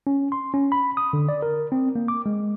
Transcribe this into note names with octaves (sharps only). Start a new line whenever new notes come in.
C#4
C6
C#4
B5
D#6
D3
D5
A#4
C4
A#3
D6
G#3